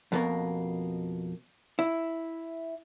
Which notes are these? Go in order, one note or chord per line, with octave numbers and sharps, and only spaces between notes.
F2 B2 A#3
E4